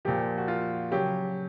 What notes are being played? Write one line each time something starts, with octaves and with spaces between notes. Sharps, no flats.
A#2 F3 G4
F#4
F4
C#3 F#3 G4